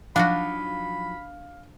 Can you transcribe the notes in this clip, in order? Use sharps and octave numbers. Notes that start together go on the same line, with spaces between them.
F3 F#3 D4 D#4 F#4 F5 B5